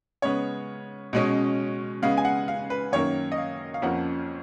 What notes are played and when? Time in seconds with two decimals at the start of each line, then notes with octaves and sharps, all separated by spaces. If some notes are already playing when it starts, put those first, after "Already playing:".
0.22 C#3 G#3 B3 C#5
1.13 B2 G#3 C#4
2.02 C#3 G#3 B3 F5
2.17 G#5
2.25 F#5
2.48 F5
2.70 B4
2.93 F#2 D#3 A#3 C#4 C#5
3.32 D#5
3.38 F5
3.74 F5
3.82 F2 F3 A#3 C#4 F#5